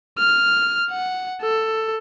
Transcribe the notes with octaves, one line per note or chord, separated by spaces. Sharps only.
F6
F#5
A4